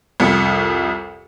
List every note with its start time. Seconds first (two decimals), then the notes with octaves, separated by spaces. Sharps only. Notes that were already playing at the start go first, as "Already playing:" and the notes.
0.20 C2 F2 C#7